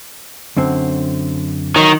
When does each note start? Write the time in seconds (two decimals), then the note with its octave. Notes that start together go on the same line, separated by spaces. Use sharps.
0.57 F#2 D3 C4
1.76 D#3 F#3 D#4 C#5